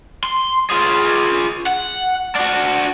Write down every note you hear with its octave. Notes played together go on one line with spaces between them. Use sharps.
C6
F4 G#4
F#5
D4 F#4